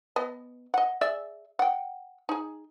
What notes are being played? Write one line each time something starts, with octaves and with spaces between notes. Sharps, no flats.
B3 D#5
D#5 F#5
G#4 D5 E5
F#5 G5
D#4 G#4